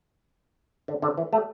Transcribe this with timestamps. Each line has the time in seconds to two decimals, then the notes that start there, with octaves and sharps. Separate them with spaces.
0.88 D3
1.02 D3
1.17 E3
1.33 A3